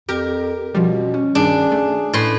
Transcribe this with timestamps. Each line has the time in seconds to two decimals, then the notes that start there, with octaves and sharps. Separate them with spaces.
0.09 F2 G4 A#4
0.74 B2 F3 G3 C#4
1.14 C#4
1.35 G2 D#3 D4 G#4
1.72 A3
2.13 A2 B4 C6